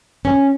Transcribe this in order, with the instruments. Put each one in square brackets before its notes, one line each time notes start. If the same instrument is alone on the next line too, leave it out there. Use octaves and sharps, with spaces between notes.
[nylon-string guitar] C#4